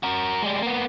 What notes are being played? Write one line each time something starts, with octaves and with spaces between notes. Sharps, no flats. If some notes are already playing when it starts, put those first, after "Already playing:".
F#4 A#4
G3 G#3
A#3 B3